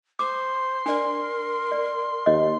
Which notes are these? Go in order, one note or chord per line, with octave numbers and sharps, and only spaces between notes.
C5 C6 D6
D4 A#4 D5
D5
D#2 D#5